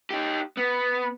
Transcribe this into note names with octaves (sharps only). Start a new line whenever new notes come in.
D#4 G4
B3